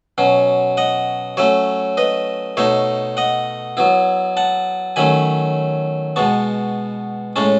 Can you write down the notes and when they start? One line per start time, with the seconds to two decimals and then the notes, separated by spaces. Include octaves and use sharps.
0.18 B2 F#3 C#4
0.77 D#5 F#5
1.37 F#3 A3 C#4 C#5 E5
1.97 B4 D#5
2.57 B2 A3 D#4 C#5 E5
3.17 D#5 F#5
3.77 F#3 B3 E4
4.37 F#5 A5
4.96 D#3 F#3 A3 C#4 G#5 B5
6.16 B2 G#3 B3 A5 C#6
7.36 A2 G#3 C#4 A5 C#6